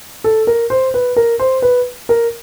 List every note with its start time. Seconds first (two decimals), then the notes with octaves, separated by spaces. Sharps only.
0.24 A4
0.47 A#4
0.70 C5
0.94 B4
1.16 A#4
1.40 C5
1.62 B4
2.09 A#4